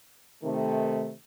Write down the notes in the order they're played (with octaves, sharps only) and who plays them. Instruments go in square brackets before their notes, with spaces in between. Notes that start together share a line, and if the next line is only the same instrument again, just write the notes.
[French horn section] C3 D#3 A3